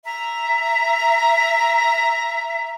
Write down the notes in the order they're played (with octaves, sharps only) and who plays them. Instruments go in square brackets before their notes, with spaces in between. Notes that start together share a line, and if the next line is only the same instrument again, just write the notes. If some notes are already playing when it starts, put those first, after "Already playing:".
[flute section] E5 A#5